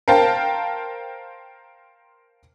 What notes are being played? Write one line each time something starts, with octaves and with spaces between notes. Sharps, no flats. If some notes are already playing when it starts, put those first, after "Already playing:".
A#4 C5 F5 G5 A5